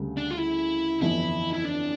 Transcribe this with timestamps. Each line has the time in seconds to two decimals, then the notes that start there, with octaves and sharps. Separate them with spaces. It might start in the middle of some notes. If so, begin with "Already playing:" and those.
Already playing: D2 C#3 G3
0.17 D4
0.31 F4
0.38 E4
1.02 G1 F2 E3 E4
1.53 E4
1.65 D4